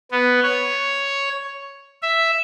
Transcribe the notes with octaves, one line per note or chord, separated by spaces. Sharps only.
B3
C#5
E5